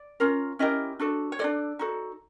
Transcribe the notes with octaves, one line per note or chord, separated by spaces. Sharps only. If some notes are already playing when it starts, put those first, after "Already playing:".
Already playing: D5
C#4 F4 A#4
C#4 E4 G4 A#4 D#5
D4 F#4 A4
C#5
D4 F#4 A4 D5
D#4 F#4 A4